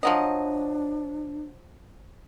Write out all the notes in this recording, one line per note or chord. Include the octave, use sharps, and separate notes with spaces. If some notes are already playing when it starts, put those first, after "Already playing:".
F3 F#3 D4 D#5